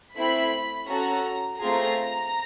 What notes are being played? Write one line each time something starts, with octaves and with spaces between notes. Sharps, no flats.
A3 C4 E4 B5
C#4 F#4 A4 A#5
A3 C4 F4 G#4 A#5